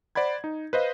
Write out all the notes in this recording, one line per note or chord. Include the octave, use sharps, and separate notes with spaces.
C5 D5 F#5 B5 G#6
D#4
B4 C5 D#5 F5